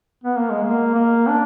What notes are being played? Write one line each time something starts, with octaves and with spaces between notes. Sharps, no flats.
B3
A#3
G#3
A#3
A#3
D4